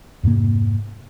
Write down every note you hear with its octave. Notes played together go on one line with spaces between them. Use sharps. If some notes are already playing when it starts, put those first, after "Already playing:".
F2 G#2 C3 A#3